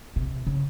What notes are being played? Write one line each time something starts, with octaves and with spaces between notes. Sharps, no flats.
C3
C#3